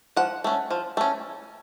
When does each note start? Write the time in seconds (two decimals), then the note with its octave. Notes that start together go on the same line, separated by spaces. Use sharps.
0.16 F3 F#5
0.44 A3 C#4
0.71 F3
0.97 A3 C#4